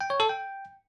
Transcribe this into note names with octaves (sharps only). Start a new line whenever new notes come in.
G5
C#5
A4
G5